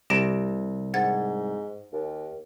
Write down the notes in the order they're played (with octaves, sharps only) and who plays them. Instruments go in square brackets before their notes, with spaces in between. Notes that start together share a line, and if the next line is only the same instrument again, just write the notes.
[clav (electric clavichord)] C2 [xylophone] G4 A#6 D7
[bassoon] G#2 [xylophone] F#5 G#6 A6
[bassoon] D#2